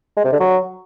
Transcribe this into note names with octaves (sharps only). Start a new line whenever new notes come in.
G#3
C3
D3
F#3